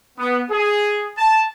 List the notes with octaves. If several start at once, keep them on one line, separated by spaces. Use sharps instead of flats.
B3
G#4
A5